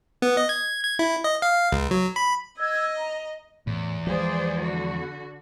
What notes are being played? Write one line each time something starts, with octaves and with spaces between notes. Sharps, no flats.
B3
D#5
G#6
G#6
E4
D#5
F5
C#2
F#3
B5
D#5 E6 G#6
A#5
E2 A2
F3 G#3 G#4 C5 D5
D3 F#4